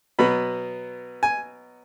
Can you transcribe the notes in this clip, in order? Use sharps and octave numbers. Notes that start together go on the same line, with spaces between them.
B2 F#3 B3 B5
G#5